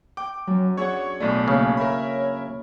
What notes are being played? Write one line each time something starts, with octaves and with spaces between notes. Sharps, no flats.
G5 D6
F#2 F#3
D4 G#4 C#5 E5 F#5 C#6
B1 A2 A3 D5
C#3 A#3 A4 C#5
A#4 E5 B5